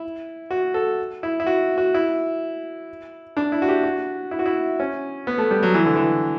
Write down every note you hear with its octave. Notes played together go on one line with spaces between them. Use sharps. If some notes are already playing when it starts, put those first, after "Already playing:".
Already playing: E4
F#4
A4
E4
E4
F#4
F#4
E4
D4
E4
F#4
G4
F#4
E4
F#4
E4
C#4
B3
A3
G3
F#3
E3
D3
E3